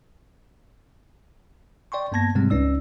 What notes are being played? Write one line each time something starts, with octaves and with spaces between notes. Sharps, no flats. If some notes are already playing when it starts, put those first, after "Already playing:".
D5 G5 C6 C#6
G2 A#3 B3 A5 G#6 A#6
G#2 C3 G3 G#3 C4
C#2 C#4 D#4 D5 E6